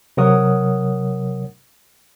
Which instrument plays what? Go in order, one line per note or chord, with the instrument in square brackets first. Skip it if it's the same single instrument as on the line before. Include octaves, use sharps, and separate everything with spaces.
[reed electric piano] C3 F#3 A#4 C#5 F#5 D#6